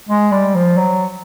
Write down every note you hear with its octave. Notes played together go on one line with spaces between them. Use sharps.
G#3
G3
F3
F#3